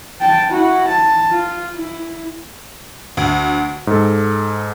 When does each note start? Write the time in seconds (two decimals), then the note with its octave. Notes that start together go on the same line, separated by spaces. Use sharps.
0.21 G5 A5
0.49 E4 F#4
0.87 A5
1.31 F4
1.76 E4
3.17 D2
3.87 G#2 A4